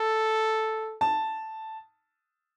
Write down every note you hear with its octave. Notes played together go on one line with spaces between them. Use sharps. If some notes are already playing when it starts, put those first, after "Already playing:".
Already playing: A4
A5